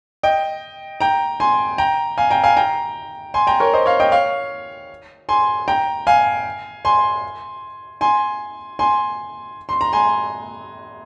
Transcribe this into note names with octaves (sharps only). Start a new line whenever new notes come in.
D#5 G5
G5 A#5
G#5 C6
G5 A#5
F5 G#5
G5 A#5
F5 G#5
G5 A#5
G#5 C6
G5 A#5
A#4 C#5
C5 D#5
C#5 F5
D#5 G5
C#5 F5
G#5 C6
G5 A#5
F5 G#5
G#5 C6
G#5 C6
G#5 C6
C6
A#5
G#5 C6